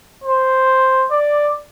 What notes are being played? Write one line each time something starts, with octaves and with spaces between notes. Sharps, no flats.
C5
D5